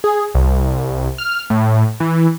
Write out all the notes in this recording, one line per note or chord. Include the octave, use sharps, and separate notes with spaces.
G#4
C2
F6
A2
E3